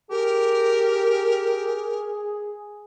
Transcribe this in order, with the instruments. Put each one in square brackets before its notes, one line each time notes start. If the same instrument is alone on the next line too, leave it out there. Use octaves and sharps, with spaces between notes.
[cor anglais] G4 [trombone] G#4 [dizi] A#4